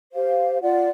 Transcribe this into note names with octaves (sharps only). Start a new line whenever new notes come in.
G4 C5 F5
F4 D5 F#5